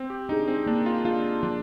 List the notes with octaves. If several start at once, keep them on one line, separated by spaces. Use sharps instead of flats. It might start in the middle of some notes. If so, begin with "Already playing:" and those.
Already playing: C4
G4
D4 D#4 G#4
C4
A#3 D4
F4
D4 F4 G#4
F3 D4